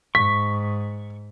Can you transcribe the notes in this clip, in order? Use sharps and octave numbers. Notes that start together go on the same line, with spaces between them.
G#2 C#6 B6